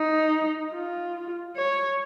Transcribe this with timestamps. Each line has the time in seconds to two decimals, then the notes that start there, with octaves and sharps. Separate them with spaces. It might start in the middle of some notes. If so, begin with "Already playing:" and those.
Already playing: D#4
0.73 F4
1.57 C#5